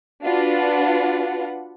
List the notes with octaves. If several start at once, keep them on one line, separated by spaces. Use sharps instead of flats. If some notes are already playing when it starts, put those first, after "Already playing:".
D4 F4 F#4 B4 F#5